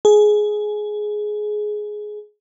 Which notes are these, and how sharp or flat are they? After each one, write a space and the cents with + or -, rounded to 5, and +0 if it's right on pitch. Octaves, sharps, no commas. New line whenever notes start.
G#4 +15